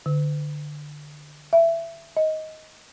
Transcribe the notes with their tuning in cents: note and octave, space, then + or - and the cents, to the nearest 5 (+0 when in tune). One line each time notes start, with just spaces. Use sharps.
D3 +15
E5 +15
D#5 +15